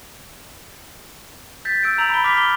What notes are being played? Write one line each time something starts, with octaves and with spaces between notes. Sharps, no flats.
G6 A6 B6
E6 G6 B6 D7
A#5 E6 F7 F#7
B5 B6 G7
D6 F6 B6 F7 G7
G7